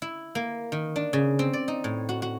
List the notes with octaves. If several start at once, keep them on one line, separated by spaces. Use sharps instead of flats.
E4
A#3
D#3
D4
C#3
C4
D5
D#4
A2
F#4
F#4